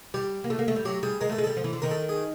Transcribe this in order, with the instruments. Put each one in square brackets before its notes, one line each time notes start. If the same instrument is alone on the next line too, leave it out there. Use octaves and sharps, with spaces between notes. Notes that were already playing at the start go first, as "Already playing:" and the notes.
[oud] G3 [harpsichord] G4
[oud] A#3
A3
A#3
A3
G3
[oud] F#3 [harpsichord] G4
[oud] G3 [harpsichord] G#4
[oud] G#3 [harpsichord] A#4
[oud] A3
[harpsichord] A4
[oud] G#3
[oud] G3 [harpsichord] A4
[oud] F3
E3
D3
[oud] D#3 [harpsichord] A#4
[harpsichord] A4
G#4